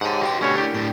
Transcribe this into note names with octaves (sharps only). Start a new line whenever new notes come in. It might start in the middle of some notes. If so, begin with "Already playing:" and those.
G#2 G4 C#5 F#5 G5 A5
F#4 B4 F5 G5 C6 D6
B2 A3 C#4 D4 G4 C#5
E4 G4 A#4
A2 D4 G5